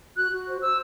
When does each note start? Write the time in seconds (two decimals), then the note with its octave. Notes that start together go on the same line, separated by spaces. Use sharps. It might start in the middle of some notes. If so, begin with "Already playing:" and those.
0.15 F#4 F#6
0.32 F#4
0.47 C5
0.61 C5 E6